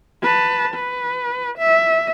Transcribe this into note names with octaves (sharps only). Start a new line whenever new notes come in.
B4 A5
B4
E5